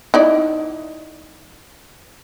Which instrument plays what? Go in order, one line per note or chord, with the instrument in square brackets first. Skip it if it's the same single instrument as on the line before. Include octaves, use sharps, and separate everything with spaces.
[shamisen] D#4 E4 D5